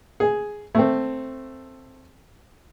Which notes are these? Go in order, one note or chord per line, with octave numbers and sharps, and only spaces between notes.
G#4
A3 C4